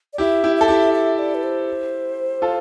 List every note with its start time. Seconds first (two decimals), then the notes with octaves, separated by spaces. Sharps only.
0.13 D5
0.18 E4 G4 E5
0.44 E4 G4
0.56 A4 E5
0.68 E4 G4
0.94 E5
1.19 D5
1.35 B4
1.43 C5
2.42 F4 A4